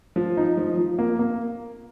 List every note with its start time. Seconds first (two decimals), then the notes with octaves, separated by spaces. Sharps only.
0.16 F3
0.37 D#4
0.57 F3
0.78 F3
0.99 A#3
1.19 A#3